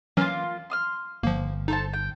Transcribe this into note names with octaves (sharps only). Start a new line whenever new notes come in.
E3 F#3 A#3 C#4 F4
C6 D#6 F6
G1 F3 A#3
D#4 A4 C5 A5
G5